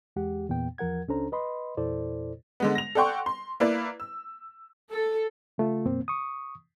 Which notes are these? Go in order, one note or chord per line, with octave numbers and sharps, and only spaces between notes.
E2 G#3 G4 F#5
E2 A#2 B3 G5
E2 F3 A#4 F#5 G#6
C#2 C#4 D4 A4 C5 A#5
B4 D#5 B5 C6
E2 A#2 E4 A4 C5 D5
D3 G#3 B3
A#6 F7
A4 D5 F#5 G5 C6 C#6
C6
A#3 E4 B4 D5
E6
A4
C#3 A3 F4
F#2 B2 A#3 C4
C#6 D#6